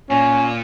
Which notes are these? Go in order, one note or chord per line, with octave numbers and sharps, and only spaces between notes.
A#2 C#4